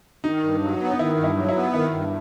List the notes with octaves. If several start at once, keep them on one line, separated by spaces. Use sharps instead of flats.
D#3 D#4
G2
F#3
B3
D#4
D#3 E4
G2
E4
F#3
E4
B3
D#3 E4
G2